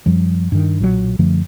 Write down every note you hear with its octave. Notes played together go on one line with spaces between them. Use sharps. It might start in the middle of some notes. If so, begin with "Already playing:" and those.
F#2 F3 G3
G2 D#3
B1 A#2 E3 F#3
F#2 D3 F3 A3